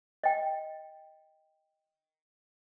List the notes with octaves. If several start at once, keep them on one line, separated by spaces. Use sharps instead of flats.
D#5 G5